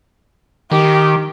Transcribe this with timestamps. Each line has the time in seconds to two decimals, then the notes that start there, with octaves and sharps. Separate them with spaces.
0.72 D#3 G4